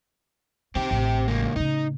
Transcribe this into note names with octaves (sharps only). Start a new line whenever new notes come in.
D#3 C4 G4
A1
C#2 A#3
A2 C#3 D#4